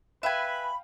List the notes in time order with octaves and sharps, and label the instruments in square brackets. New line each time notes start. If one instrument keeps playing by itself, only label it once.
[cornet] B4 [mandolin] E5 G#5 [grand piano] F5 G5 [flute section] B5